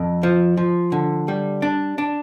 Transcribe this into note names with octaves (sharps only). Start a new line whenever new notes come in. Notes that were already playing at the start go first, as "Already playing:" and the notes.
Already playing: F2
F3
F3
D3
G3
D4
D4